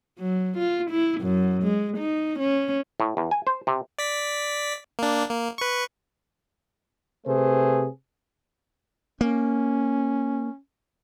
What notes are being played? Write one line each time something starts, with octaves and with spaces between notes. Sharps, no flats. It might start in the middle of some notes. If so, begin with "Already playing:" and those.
F#3
F4
E4
F#2
G#3
D#4
C#4
A2
E2
G#5
C5
C3
D5 B6
A#3 D4
A#3
B4 C#6
C3 A3 G#4 B4 C5
A#3 C#4